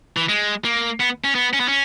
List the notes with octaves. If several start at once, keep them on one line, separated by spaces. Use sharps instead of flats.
E3
G#3
A#3
B3
C#4
B3
C#4
B3
C#4